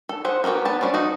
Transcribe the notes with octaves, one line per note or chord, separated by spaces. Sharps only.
A4
G#4 C5 F#5
B3 F#4 G4 A4 A#4
B3 A5
F3 G3 C#4 D4
D#4 F#4